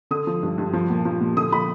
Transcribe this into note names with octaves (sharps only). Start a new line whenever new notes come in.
D3 D#6
F3
G2
G2
F3
A#2
F3
A#2
D3 D#6
F3 B5